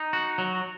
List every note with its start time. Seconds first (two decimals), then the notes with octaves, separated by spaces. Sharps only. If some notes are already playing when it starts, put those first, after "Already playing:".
Already playing: D#4
0.13 F#4
0.38 F#3